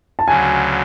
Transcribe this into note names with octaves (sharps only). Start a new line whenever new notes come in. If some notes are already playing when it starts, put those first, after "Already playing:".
A5
D2 C#3 F#3 G#5